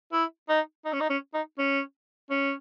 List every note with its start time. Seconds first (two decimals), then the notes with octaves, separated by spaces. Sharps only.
0.13 E4
0.49 D#4
0.85 D#4
0.93 C#4
1.00 D#4
1.10 C#4
1.34 D#4
1.58 C#4
2.30 C#4